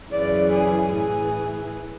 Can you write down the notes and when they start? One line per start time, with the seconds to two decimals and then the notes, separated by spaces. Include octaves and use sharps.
0.12 F#2 C#3 E3 D5
0.52 G#4
0.92 A2 E3 G#4